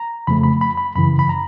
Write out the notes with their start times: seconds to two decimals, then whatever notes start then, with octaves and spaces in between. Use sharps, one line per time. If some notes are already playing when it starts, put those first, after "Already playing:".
Already playing: A#5
0.27 F2 C#3 F3 A3 B5
0.43 B5
0.61 B5
0.77 B5
0.95 F#2 C#3 E3 B5
1.19 B5
1.29 A#5